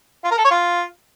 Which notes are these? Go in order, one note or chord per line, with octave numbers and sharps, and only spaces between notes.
F4
A#4
A4
C#5
F4